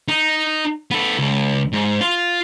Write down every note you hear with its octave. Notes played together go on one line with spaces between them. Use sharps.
D#4
B3 A4
C#2
G#2
F4